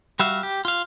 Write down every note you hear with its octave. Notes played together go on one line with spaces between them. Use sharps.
G3 F#4 E5 F5
G4
F4 F5